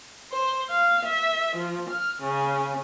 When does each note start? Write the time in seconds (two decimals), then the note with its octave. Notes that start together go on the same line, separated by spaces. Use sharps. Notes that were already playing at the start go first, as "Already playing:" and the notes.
0.31 C5
0.69 F5
1.04 E5
1.56 F3
1.89 F6
2.22 C#3